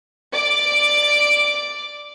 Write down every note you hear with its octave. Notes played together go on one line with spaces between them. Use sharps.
D5 D6